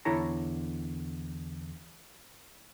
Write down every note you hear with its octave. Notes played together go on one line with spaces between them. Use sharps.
E2 D3 E4 C#5 A5 A#5